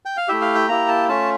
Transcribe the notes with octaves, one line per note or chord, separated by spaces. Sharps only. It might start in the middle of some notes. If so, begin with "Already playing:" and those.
G5
F5
A3 E4 G4 E5
F5
G5
A#3 E4 G4 A#5
A5
A3 C#4 F4 A5